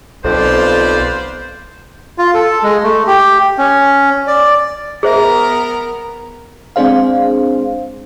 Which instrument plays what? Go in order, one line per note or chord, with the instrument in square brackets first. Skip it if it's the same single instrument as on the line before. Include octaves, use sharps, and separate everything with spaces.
[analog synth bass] B1 [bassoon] F2 [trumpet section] F4 B4 D5 [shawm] C5
[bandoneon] F4
A4
G#3
A3
G4
C#4
D5
[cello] B3 A#4 [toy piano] G#4 C5 E5
[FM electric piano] G#3 C4 D4 G#4 C5 F5